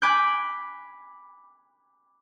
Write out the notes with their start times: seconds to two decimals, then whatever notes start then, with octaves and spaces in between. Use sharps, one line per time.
0.02 G#5 B5 D6 F#6 G6